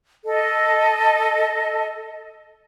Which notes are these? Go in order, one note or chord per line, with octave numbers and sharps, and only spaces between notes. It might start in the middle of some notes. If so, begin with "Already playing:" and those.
A4 D#5